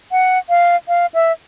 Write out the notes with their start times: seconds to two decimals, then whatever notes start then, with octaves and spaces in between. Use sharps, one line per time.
0.12 F#5
0.49 F5
0.88 F5
1.14 E5